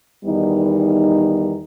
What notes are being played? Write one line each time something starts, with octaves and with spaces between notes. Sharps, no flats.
E2 D#3 G3 B3 D#4